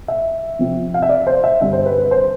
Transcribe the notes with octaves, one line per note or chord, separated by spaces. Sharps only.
E5
C3 F3 C4
F5
E5
D5
C5
E5
G2 D3 G3 C4 E5
C5
B4
B4
C5